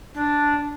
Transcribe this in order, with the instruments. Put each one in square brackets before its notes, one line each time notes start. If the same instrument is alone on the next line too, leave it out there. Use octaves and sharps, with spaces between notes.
[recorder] D4